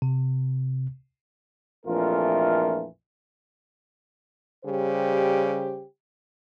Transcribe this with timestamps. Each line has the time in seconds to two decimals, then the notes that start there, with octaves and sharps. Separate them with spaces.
0.02 C3
1.86 A#1 F2 E3 A3 F4 A#4
4.65 C#3 G3 G4 C5